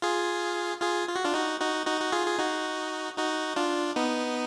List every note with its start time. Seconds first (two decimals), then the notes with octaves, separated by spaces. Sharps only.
0.02 F4 G#4
0.81 F4 G#4
1.08 F4
1.16 F#4
1.25 D4 F4
1.34 D#4 F#4
1.60 D#4 F#4
1.86 D#4 F#4
2.01 F#4
2.12 F4 G#4
2.27 G#4
2.38 D#4 F#4
3.18 D#4 F#4
3.56 D4 F4
3.96 B3 D#4